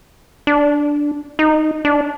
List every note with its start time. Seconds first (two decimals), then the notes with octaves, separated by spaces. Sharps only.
0.47 D4
1.39 D#4
1.85 D4